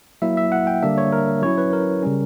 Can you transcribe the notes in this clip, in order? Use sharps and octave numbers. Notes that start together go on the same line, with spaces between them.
F#3 A#3 E4 E5
E5
F#5
G5
D3 G3 A#3 D4 E5
C#5
A#4
F#3 C#4 E4 C#5
B4
A#4
C#3 G3 C#4